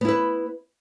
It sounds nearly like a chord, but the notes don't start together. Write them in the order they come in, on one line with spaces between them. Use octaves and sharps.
B3 E4 B4